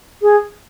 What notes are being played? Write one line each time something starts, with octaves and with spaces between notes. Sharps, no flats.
G#4